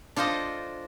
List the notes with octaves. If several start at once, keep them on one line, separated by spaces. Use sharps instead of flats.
D4 F4 A4 C5 D#5